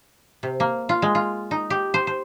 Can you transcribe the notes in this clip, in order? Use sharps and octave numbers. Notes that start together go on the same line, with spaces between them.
C3
A#3
F4
G#3
F4
D#4
G4
C5
C5